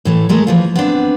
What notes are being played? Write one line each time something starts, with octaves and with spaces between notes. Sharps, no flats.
A2 E3 A3
G#3 A3 A#4
E3 F3 F4
B3 C4 D4